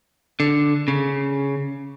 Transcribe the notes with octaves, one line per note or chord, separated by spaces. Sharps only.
D3
C#3